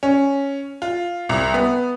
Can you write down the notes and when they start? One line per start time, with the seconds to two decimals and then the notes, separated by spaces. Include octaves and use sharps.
0.03 C#4
0.82 F4
1.29 C2
1.54 B3